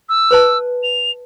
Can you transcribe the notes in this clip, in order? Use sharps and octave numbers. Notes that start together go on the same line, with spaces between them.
E6
B4 C5 A5
F7